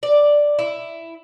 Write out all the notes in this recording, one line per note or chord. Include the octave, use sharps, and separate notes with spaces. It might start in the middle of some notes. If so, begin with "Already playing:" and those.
D5
E4